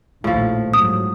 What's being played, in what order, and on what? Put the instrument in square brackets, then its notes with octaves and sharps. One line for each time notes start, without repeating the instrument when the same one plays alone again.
[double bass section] A#1 D#2 [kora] A2 F3
[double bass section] G#2 F#3 [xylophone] D#6